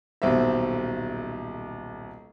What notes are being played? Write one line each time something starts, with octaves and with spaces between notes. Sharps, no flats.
D#1 B1 C4 E5